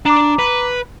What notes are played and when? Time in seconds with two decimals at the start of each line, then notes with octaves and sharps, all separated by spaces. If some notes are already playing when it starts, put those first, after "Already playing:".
0.05 D4 A#5 D6
0.39 B4